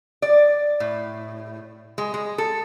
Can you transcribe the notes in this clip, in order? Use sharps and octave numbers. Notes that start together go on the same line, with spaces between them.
D5
A2
G#3
G#3
A4